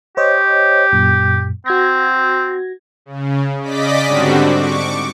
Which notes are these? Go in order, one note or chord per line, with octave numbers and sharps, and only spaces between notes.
G4 C5 C#5 D#5
F#2 A#2
C4 F#4 G#6 A#6
C#3
C#3 D5 D#5 D6 B6
G#2 D3 G3 C4 D4 F#4
C#6 D6